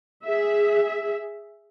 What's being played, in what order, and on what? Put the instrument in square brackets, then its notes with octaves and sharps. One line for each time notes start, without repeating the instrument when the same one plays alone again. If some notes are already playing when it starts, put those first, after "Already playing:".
[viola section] G#4 E5